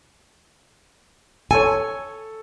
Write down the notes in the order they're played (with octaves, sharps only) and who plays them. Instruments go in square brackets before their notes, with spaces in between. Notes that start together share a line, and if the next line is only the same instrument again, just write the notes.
[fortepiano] A4 C#5 [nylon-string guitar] G#5